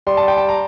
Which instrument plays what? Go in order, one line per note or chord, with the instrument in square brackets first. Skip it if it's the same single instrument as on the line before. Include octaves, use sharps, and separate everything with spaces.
[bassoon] G3 [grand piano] C6
[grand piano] A5
G5
A5
A#5